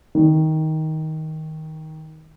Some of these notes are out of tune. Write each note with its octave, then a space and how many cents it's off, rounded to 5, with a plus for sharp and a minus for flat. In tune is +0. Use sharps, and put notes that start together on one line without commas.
D#3 +15